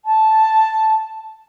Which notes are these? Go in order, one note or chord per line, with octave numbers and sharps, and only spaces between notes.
A5